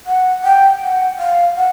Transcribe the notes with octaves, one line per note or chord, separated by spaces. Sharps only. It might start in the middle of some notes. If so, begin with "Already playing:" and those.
F#5
G5
F#5
F5
F#5